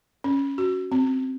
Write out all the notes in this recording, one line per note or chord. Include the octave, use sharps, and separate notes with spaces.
C#4
F#4
C4